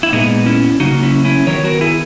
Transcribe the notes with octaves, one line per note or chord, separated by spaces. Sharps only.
E4
A#2 G#3 B3 D#4
C#4 E4
C#3 F#3 A#3 D#4 F#4
C#4 E4
C#4 E4
D#3 F#3 B3 A#4 C#5
F#4 A#4
E4 G#4